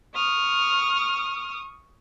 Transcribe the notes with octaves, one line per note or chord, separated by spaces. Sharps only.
C#6 D#6 F6